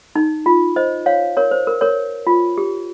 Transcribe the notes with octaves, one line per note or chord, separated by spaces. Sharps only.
D#4
F4
C5 D#5
C#5 F5
A#4 C#5
C5
A#4
A#4 C#5
F4
G4